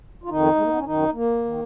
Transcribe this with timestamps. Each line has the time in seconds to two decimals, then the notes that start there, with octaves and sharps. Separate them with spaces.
0.24 F4
0.29 F2 D#3 D#4
0.55 G#3
0.62 A#3
0.70 B3
0.77 C#4
0.85 F#2 D#3 D#4
1.13 A#3
1.45 D#3